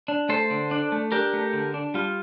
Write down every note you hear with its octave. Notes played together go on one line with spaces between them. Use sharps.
D4
A3 A4 C5
D3
D4
A3
D4 G4 A#4
A3
D3
D4
G3 F4